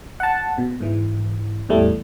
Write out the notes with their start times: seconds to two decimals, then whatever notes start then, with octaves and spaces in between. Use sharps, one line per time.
0.20 F#5 A5
0.58 B2
0.80 G#2 E3
1.69 E2 A2 G3 A3